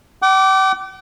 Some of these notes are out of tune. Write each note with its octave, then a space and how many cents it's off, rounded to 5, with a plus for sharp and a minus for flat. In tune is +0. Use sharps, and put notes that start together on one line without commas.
G5 -45 D6 -10